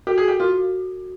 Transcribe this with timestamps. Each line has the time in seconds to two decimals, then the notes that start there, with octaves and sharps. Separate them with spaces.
0.07 F#4 G4
0.18 G#4
0.28 G4
0.40 F4 F#4